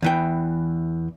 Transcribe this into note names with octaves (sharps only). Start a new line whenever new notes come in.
E2 E3 G5